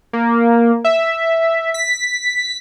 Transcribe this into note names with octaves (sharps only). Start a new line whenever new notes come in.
A#3
E5
B6